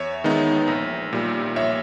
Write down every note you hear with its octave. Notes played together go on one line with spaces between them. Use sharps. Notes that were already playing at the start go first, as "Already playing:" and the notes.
Already playing: E2 C#5 E5
D#3 G#3 B3 D#4
A#1
A#2 G3
A#1 C#5 E5